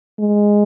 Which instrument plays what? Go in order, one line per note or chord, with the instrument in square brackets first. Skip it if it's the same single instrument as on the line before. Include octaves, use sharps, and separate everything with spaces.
[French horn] G#3